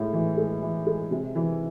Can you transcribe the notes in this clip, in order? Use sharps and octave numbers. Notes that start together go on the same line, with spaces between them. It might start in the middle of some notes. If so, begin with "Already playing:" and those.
Already playing: A2 G#3
E3
G#3
E3
G#3
C3
E3